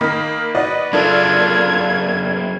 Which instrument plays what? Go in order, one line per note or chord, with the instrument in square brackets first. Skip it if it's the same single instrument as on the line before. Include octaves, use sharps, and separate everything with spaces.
[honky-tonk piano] D#3 A#3 D#6 [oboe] B5
[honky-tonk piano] F#4 D5 D#5 [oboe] B4
[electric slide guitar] F#3 A#3 [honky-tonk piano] D4 A4 [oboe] F4 [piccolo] G#6